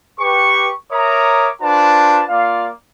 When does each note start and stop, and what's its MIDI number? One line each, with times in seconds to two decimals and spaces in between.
0.20 0.71 67
0.20 0.71 71
0.20 0.71 85
0.92 1.49 70
0.92 1.49 73
0.92 1.49 76
0.92 1.49 82
0.92 1.49 86
0.92 1.49 87
1.61 2.23 62
1.61 2.23 65
1.61 2.23 71
1.61 2.23 72
1.61 2.23 81
2.28 2.68 58
2.28 2.68 65
2.28 2.68 74
2.28 2.68 77